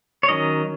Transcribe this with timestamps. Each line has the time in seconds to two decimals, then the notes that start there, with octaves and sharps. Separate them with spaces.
0.23 C#5
0.29 D#3 F#3 C#4 D#5